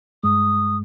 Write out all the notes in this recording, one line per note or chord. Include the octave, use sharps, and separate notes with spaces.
G2 G#3 D#6